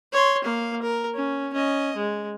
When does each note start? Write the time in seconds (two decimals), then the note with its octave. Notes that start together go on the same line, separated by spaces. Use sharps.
0.12 C#5 C6
0.44 A#3 F5
0.82 A#4
1.15 C#4
1.53 C#4 D#5
1.96 G#3